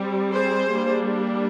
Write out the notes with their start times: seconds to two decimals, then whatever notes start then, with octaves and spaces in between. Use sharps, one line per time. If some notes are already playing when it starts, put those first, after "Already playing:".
Already playing: G3 C4
0.33 G#4 C5
0.72 G3 A#3 D4